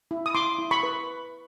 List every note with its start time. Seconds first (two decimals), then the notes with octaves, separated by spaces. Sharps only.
0.11 E4
0.26 D#6
0.34 E4 C6 D6
0.58 E4
0.71 B5 C#6
0.83 B4